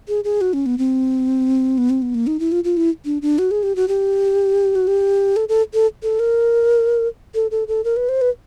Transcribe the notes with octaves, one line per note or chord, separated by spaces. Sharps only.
G#4
G#4
F#4
C#4
B3
C4
B3
C4
B3
A#3
D#4
E4
F4
F4
E4
D4
D4
F#4
G#4
G4
F#4
G4
F#4
G4
A4
A4
A4
A4
A#4
A4
A4
A4
A#4
B4
C5
B4